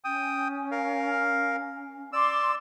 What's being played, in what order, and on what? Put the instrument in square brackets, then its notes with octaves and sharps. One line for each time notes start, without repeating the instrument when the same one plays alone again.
[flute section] C#4 [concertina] G5 D#6
[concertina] A#4 F5
[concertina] D5 E6 [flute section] C6 D6